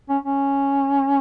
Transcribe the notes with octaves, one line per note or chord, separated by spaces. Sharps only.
C#4
C#4